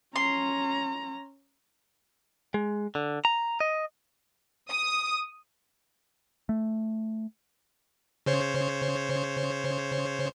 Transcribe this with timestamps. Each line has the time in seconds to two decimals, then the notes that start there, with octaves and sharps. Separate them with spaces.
0.16 C#4 A#5 C6
2.54 G#3
2.95 D3
3.25 A#5
3.60 D#5
4.69 D#6
6.49 A3
8.26 C#3 C5 C#5